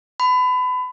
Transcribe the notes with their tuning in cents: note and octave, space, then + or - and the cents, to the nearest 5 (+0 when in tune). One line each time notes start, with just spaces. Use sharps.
B5 +30